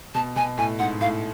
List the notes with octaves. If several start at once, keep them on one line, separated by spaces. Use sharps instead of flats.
B2 A5
B2 G#5
A2 G#5
G#2 F#5
A2 F5